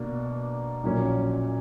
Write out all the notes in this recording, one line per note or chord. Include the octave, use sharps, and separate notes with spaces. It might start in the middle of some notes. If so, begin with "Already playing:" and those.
Already playing: B2 A#3 D4
A#1 A#2 F#3 A#3 C#4